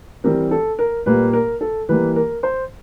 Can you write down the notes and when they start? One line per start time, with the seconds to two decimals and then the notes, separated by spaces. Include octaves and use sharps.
0.24 E3 G3 C4 A#4
0.51 A4
0.79 A#4
1.06 A#2 G3 A#3 B4
1.33 A#4
1.61 A4
1.89 E3 G3 A#3 B4
2.16 A#4
2.43 C5